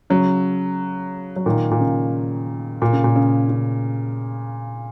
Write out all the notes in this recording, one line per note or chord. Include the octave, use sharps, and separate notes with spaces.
C#3 F#3
F#3
A#2 D#3
A#2
C#3
A#2
C#3
A#2
C#3
C#3